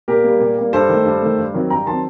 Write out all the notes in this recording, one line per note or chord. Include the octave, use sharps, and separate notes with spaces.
A#2 G4 A#4
G3 A#3
A#2
G3 A#3
G2 A4 C5
D#3 A3
G2
D#3 A3
G2
D#3 F#3 C4
G2 G5 A#5
D#3 F#3 C4 A5 C6